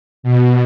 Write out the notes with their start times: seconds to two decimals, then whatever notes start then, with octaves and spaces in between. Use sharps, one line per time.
0.23 B2